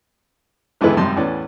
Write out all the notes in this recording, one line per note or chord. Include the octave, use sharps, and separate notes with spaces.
G#1 E2 D3 G#3 E4 B4
G#1 F#2 C3 G3 A5 C6
E2 A2 B3 C#4 D5